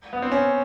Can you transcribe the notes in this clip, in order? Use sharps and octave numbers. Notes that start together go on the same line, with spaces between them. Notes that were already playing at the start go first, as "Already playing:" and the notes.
B3
C4
C#4